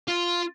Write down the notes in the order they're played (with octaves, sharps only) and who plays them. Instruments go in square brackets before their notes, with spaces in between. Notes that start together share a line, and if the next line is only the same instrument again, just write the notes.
[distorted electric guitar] F4